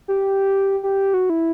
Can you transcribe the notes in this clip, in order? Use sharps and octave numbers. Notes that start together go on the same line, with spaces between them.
G4
G4
F#4
E4